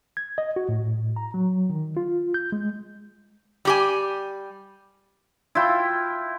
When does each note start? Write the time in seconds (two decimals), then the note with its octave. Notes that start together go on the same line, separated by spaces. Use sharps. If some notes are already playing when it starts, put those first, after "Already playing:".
0.17 G#6
0.38 D#5
0.56 F#4
0.69 A2
1.16 A#5
1.34 F#3
1.70 D#3
1.97 F4
2.34 G6
2.52 G#3
3.65 G3 G4 G#5
5.55 E4 F4 G5